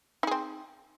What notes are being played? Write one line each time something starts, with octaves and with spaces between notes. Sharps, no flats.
C4 D#4 G#4